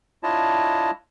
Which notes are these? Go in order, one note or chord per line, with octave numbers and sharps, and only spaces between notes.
D4 E4 F4 C#5 D#5 A5